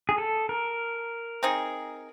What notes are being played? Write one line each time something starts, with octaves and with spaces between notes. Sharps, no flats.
G#4
A4
A#4
C4 D#4 G#4